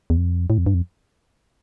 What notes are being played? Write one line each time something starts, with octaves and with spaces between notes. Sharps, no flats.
E2
F2
A2
F2
G2
F2